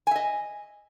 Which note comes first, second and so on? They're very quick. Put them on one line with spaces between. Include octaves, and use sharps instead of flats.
G#5 E5 D#5